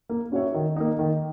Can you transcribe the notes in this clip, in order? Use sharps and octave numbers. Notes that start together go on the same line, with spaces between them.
A#3
C#4 F#4 C#5 E5
D#3
A#3 D#4
D#3